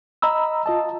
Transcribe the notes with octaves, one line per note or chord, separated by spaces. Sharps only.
D#5 A#5 B5 E6
F4 D#5 A5